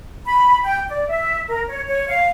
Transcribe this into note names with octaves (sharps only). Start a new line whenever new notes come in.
B5
G5
D5
E5
A#4
C#5
C#5
F5